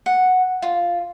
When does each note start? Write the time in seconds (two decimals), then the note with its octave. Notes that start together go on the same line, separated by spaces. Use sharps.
0.06 F#5
0.62 F4